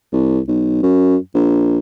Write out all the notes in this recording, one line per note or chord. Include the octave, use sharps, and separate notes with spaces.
C2
B1
F#2
A#1